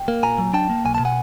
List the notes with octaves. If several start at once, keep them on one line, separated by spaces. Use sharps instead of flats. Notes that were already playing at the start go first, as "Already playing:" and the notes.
Already playing: G5
A#3
A#2 G#5 A#5
F#3
D4 G5 A5
A#3
B1 G#5
B2 A5
F#5 G#5